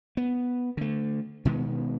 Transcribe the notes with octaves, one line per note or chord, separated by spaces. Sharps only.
B3
D3 A3
B2 D#3 G#3 B3